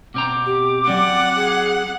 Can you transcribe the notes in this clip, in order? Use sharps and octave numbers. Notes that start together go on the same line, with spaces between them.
B2 C4 A#5 D6
G4
F#3 C4 D5 F#5
G#4